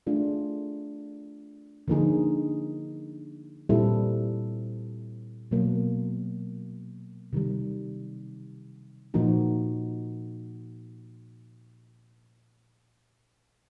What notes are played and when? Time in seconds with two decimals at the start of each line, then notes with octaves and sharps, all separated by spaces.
0.07 A3 D4 F4 G#4
1.88 D3 F3 A#3 D#4 G#4
3.69 A#2 G3 C4 E4 A4
5.51 B2 F#3 A#3
7.33 C3 D#3 G3
9.14 A#2 F3 A#3 D#4 F#4